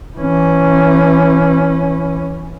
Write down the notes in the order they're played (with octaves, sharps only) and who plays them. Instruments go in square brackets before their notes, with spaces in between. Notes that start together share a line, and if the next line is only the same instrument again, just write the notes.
[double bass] E3 C#4